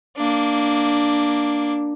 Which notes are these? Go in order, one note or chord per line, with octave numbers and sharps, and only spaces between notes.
A#3 D4